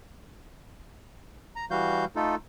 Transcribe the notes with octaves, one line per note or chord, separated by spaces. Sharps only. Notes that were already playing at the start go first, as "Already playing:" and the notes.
A#5
E3 G3 F#4 F5 G6
A3 D#4 F4 A4